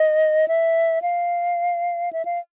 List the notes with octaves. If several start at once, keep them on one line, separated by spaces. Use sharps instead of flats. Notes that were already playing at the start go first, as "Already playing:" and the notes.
Already playing: D#5
E5
F5
E5
F5